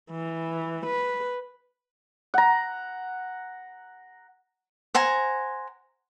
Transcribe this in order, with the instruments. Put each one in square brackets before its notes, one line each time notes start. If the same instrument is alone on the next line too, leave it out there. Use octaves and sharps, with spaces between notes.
[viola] E3
B4
[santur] F#5 A#5
[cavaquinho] C5 F#5 G#5 A#5